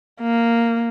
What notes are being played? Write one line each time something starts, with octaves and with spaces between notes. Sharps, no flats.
A#3